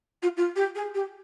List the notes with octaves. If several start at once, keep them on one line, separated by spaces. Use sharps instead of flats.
F4
F4
G4
G#4
G4